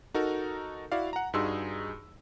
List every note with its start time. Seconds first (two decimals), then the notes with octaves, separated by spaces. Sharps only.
0.14 D#4 F#4 A4 A#4
0.92 E4 F#4 D5 F5
1.13 F#5 A#5
1.34 G2 D#4 F#4 G#4 C6 E6